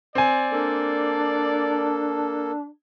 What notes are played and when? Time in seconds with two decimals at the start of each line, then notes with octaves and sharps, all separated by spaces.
0.15 C4 D5 G#5
0.52 A#3 D4 A4